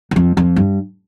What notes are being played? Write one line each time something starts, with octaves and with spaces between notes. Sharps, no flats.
E2
F2
F2
G2